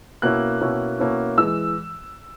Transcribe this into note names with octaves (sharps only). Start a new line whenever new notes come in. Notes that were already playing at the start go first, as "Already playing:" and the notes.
B2 A#3 C#4 E4 F#6
B2 A#3 C#4 E4
B2 A#3 C#4 E4
E3 G#3 E6